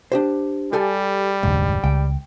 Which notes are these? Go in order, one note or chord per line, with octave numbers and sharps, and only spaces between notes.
D4 G4 C5
G3 G4 A4 G#5
F1 D2 G#2
C#2 G5